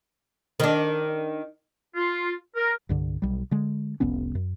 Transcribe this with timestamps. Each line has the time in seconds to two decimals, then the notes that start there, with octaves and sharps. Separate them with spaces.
0.60 D#3 D4
1.95 F4
2.55 A#4
2.89 C2 G2 D3
3.22 B1 G3
3.51 D3 G#3
4.00 F1 C2 B3 C#4
4.35 F#2